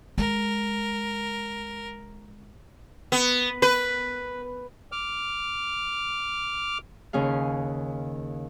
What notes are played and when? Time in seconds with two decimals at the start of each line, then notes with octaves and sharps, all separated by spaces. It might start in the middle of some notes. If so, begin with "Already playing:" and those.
0.18 G#3 A#4
3.12 B3
3.62 B4
4.92 D6 F6
7.13 D#2 C#3 C#4 G#4 F5